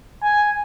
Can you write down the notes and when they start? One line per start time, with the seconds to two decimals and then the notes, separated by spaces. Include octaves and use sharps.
0.22 G#5